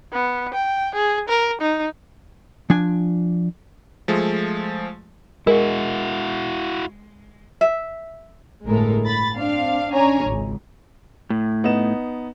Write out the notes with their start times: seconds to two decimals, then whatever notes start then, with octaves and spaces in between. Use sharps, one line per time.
0.13 B3
0.54 G5
0.95 G#4
1.29 A#4
1.61 D#4
2.70 F3 D4 G#5
4.08 F3 G#3 A3
5.47 G#3 E4 F#4 A#4
7.61 E5
8.65 G1 A2 G#3 A4 A#4
9.05 B5 A6
9.37 C4 D4 F5
9.94 C#4 D4 C#5 G#5 A#5
10.27 G#1 C#2
11.30 A2
11.64 B3 D#4 E7